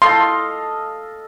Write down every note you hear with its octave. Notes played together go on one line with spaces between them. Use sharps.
A4 D#5 F5 C6